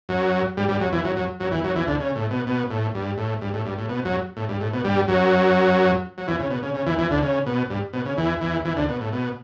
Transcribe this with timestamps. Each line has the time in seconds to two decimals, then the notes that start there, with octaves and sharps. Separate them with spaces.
0.09 F#2 F#3
0.57 G2 G3
0.69 G2 G3
0.80 F#2 F#3
0.92 E2 E3
1.04 F#2 F#3
1.16 F#2 F#3
1.40 F#2 F#3
1.51 E2 E3
1.64 F#2 F#3
1.76 E2 E3
1.87 D2 D3
2.00 C#3
2.16 A2
2.31 B2
2.47 B2
2.70 A2
2.95 G2
3.18 A2
3.41 G2
3.54 A2
3.66 G2
3.78 A2
3.89 B2
4.05 F#2 F#3
4.37 A2
4.49 G2
4.60 A2
4.73 B2
4.84 G2 G3
5.08 F#2 F#3
6.18 F#3
6.28 E2 E3
6.39 C#3
6.50 B2
6.63 C#3
6.74 C#3
6.86 E2 E3
6.98 E2 E3
7.11 D2 D3
7.22 C#3
7.46 B2
7.70 G2
7.93 B2
8.06 C#3
8.17 E2 E3
8.41 E2 E3
8.65 E2 E3
8.76 D2 D3
8.89 B2
9.01 A2
9.13 B2